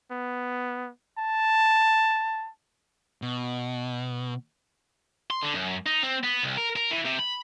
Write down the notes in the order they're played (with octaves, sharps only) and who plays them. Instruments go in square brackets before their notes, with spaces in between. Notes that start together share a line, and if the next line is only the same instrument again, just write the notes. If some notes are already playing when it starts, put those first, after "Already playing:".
[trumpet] B3
A5
[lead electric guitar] B2
[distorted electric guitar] C6
D3
F#2
D#4
C4
B3
C2
A#4
A#4
E3
C3
B5